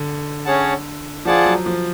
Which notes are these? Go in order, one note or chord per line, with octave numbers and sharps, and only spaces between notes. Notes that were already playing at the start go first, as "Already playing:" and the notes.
Already playing: D3
C#4 G#4 C#5 F#5 A5
F3 F4 G#4 D5 F#5 A5
F#3
F3